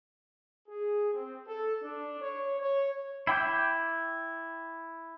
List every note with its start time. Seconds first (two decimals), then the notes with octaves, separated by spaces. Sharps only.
0.68 G#4
1.13 C4
1.46 A4
1.83 D4
2.21 C#5
2.60 C#5
3.27 E4 G5 D6 G6